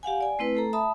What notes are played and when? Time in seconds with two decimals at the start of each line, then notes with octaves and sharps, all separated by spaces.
0.03 G4 F5 F#5 G#5
0.21 D5 G#5
0.39 A3 C4 E4 B4
0.55 A3 A4 A#5
0.73 E5 A5 B5 D#6